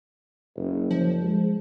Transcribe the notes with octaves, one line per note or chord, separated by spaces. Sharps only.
F#1
F3
G#3